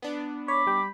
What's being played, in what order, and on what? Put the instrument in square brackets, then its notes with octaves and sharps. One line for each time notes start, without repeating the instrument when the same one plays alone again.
[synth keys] B3 D4
[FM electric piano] C#5 [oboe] B5 [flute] D6
[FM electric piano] G3 G5